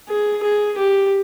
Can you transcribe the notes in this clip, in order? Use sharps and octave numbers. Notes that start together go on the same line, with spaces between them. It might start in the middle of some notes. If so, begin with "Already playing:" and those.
G#4
G#4
G4